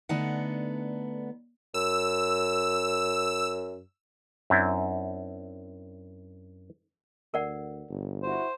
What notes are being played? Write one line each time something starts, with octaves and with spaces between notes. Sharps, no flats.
D3 A3 B3 D4 D#4 F#5
F#2 E6
F#2 C4 D4 E4
D2 A#4 D5 F#5
G1
E4 F#4 C5